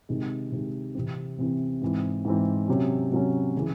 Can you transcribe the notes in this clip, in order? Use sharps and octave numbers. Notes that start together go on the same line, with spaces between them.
C3 D#3 G#3
C3 D#3 G#3
C3 E3 C4
C3 E3 C4
G#2 E3 C4
G#2 E3 C4
C3 F#3 C#4
C3 F#3 C#4
C#3 E3